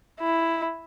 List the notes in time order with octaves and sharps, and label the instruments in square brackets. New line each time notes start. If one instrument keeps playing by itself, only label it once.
[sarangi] E4